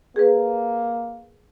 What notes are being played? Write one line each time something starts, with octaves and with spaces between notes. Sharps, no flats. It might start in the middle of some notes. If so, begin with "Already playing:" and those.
A#3 G#4 B4